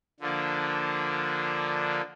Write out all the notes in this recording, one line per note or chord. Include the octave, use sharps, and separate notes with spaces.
D3 F3 A#3 D4